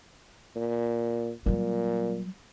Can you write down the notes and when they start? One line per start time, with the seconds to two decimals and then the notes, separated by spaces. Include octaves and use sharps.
0.56 A#2
1.46 A#2 F#3 G3